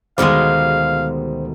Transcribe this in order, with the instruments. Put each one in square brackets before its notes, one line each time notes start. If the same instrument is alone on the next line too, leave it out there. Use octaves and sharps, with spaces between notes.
[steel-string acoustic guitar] D2 B2 D#3 [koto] G3 G#3 [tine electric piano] C5 [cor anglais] F5